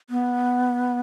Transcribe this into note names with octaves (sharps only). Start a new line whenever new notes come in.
B3